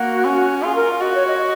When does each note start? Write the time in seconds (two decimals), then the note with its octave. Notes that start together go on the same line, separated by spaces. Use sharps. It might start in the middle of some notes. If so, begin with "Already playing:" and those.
Already playing: A#3 F#4
0.24 C#4
0.62 F4 G#4
0.76 A#4
1.01 F#4 D#5
1.14 C#5
1.26 D#5
1.39 D#5